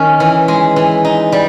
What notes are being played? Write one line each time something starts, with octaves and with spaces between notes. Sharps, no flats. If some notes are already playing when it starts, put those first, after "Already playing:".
Already playing: D#3 C#4
E3
G#3
E3
D#4
G3